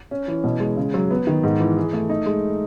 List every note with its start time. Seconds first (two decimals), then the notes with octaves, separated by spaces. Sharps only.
0.11 C#4
0.28 E3
0.44 B2
0.60 G#3
0.77 C#3
0.94 F#3
1.11 B3
1.27 D#3
1.43 G#2
1.60 E3
1.77 G#4
1.93 A3
2.10 D#4
2.26 G#3